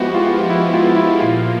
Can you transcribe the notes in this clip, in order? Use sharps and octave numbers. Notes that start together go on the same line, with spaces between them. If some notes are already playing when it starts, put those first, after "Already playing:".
Already playing: F3 G#3 B3 E4 F#4 G4
F4
E4
F4
E4
A#2 F3 A#3 F4